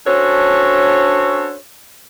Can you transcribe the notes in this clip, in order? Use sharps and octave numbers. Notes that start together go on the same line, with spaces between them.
C#4 D4 F#4 A4 C5 C#5